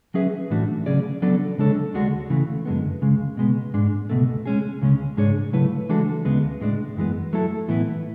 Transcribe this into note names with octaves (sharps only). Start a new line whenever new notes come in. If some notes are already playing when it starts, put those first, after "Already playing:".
F#3 C#4 G#4 B4 E5
A2 E3 A3 D4 F#4
C#3 F#3 C#4 G#4 D5
F#3 B3 D4 A4 D5
C#3 G#3 D4 A4 C#5
D2 D3 G#3 D4 F#4
C#3 E3 A3
F#2 D3 G#3 B3
C#2 C#3 G#3
B2 G#3 B3
G#2 G#3 D4
C#2 B2 A3
G#3 C#4 G#4
C#2 C#3 G#3 C#4
G#2 G#3 D4 G#4 C#5
C#3 F#3 A3 E4 B4
E3 G#3 D4 F#4 A4
D2 C#3 G#3 B3
A2 G#3 D4
F#2 E3 G#3 B3
F#3 A3 E4 A4
A2 E3 B3 E4